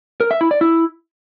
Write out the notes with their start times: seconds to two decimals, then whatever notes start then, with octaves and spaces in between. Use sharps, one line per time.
0.20 A#4
0.31 E5
0.41 E4
0.51 D5
0.61 E4